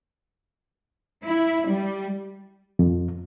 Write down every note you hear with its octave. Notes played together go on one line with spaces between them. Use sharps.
E4
G3
F2